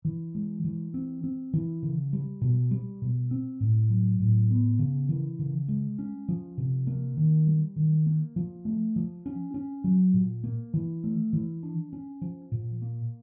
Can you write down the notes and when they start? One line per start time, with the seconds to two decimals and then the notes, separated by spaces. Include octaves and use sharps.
0.05 E3
0.35 G#3
0.64 E3
0.94 C4
1.24 C4
1.54 E3
1.83 C#3
2.13 G3
2.41 B2
2.71 G3
3.02 B2
3.31 C4
3.60 A2
3.90 F#3
4.20 A2
4.51 B3
4.79 C#3
5.09 E3
5.39 C#3
5.68 G#3
5.99 C#4
6.28 F3
6.58 C3
6.87 A#3
7.17 D#3
7.47 G3
7.76 D#3
8.06 A#3
8.36 F3
8.65 A3
8.96 F3
9.26 C#4
9.54 C#4
9.84 F#3
10.14 A#2
10.44 A#3
10.74 E3
11.04 A3
11.33 E3
11.63 D4
11.93 C#4
12.21 F3
12.52 A#2
12.82 A#3